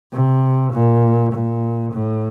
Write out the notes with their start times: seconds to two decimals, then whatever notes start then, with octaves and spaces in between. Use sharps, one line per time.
0.13 C3
0.73 A#2
1.33 A#2
1.93 A2